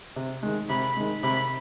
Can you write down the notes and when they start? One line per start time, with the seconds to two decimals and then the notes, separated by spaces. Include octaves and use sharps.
0.16 C3
0.43 D#3 G#3
0.69 C3 B5
0.97 D#3 G#3
1.23 C3 B5